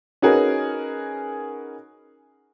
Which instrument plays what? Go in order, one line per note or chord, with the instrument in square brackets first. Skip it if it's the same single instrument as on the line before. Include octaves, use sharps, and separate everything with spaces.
[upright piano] C#4 D#4 F#4 G#4 A#4 B4